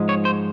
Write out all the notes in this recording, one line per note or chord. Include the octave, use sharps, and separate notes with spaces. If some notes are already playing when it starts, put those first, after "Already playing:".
Already playing: G#2 F3 G#3
C#5
C5